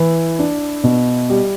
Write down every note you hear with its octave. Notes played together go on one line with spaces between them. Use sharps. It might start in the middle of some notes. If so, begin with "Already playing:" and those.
Already playing: E3 E4
D4
B2
G3